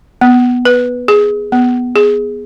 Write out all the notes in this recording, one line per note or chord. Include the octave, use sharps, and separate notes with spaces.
B3
B4
G#4
B3
G#4